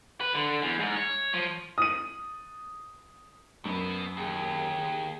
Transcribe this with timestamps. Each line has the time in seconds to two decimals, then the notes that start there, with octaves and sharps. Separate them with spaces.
0.21 B4
0.34 D3
0.62 E2
0.80 G#2
0.96 C#5
1.34 F3
1.78 D#6 D#7
3.65 F#2 B2 B3
4.17 D#2 G#4